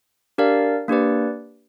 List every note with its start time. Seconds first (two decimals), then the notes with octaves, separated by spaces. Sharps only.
0.38 D4 G4 A#4 D5 F5
0.88 A#3 D4 G4 B4 D5